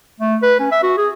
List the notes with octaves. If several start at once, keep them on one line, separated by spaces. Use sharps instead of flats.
A3
B4
C#4
E5
F#4
G#4